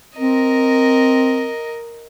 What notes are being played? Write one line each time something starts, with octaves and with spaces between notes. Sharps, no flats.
C4 A#4 D#5